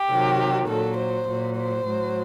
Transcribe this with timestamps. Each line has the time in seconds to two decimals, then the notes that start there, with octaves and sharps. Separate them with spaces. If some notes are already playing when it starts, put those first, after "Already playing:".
Already playing: G4
0.09 C3 D#3 F#3
0.68 A#2 F#3 A4
0.98 C5
1.27 A#2 F#3
1.57 C5
1.86 A2 F#3